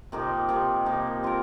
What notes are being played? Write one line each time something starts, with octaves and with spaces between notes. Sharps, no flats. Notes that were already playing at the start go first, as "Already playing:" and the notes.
C3 F3 A#3 D#4
C3 F3 A#3 D#4
C3 F3 A#3 D#4
C4 F4 A#4